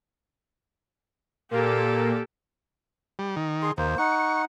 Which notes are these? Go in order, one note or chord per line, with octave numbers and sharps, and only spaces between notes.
A#2 A#3 G4 A4
G3
D#3
G#4 C6
D#2 A#3 C5
D#4 F#5 C#6